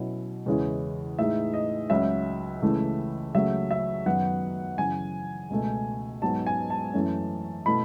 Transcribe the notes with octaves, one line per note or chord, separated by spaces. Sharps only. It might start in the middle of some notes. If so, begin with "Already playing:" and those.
Already playing: B2 F#3 C#4 E4
E2 C#3 G#3 C#4 E4
A2 G#3 D#4 E5
D#5
C#2 C#3 F#3 C#4 E5
C#2 C#3 E3 A3 E4
C#2 C#3 F#3 A3 E5
E5
F#2 D#3 F#3 B3 F#5
F#2 C#3 E3 G#5
C#2 B2 A3
G#2 F#3 B3 D#4 A5
G#5
A5
F#2 E3 A3 C#4
B2 A3 E4 B5